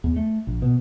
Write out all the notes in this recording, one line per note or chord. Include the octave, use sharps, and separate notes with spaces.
E2
A3
A#1
B2